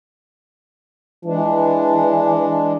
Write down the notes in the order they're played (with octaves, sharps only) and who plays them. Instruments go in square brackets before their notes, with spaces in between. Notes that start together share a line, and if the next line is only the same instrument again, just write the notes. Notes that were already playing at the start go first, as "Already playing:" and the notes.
[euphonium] E3 [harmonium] G#3 D4